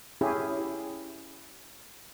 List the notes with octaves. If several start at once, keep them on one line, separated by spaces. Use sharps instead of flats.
C#4 E4 G4 G#4